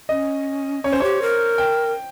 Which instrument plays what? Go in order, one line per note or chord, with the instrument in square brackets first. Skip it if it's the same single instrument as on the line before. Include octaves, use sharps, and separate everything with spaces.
[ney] C#4 [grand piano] D#5
[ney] C#4 [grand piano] C#5
[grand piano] C5
[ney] G4 [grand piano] C#5
[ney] A#4
[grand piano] G5